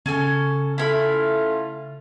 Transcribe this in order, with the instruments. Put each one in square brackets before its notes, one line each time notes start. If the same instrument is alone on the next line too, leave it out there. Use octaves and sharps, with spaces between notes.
[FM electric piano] C#3 [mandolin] C#4 A4 G#5
[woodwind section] A3 C#4 F4 [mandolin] E4 B5